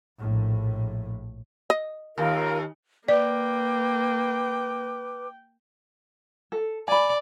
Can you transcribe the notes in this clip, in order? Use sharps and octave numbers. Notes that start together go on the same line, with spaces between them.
A#1 A2
D#5
D#2 F4 A#4
A#3 B4 D5 G5 D6
A4
D5 G#5 B5